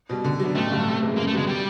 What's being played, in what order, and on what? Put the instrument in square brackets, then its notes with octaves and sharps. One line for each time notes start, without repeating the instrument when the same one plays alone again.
[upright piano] B2 G3
D3
F#3 B3 D4
[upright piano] A1 [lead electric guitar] A3
[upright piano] G2 D3 F#3
C3
E3 G#3
[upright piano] F#2 [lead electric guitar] A#3
[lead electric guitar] A3
[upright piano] D3 F#3 B3 [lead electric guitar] G#3
[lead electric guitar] G3